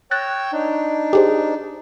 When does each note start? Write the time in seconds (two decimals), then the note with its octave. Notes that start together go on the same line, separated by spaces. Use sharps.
0.11 C#5 G5 E6 F#6 A6 A#6
0.53 D4 D#4
1.13 G4 G#4 C5